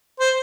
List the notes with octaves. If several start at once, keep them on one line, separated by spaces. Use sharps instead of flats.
C5